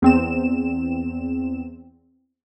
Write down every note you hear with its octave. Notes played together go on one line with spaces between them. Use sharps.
E2 C4 E7